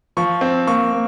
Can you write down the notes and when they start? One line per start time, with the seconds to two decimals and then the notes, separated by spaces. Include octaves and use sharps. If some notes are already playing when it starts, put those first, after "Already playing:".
0.17 F3 C#6
0.41 C4
0.67 A#3 C#6
0.93 A#3